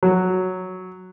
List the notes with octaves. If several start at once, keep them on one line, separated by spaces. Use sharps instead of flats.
F#3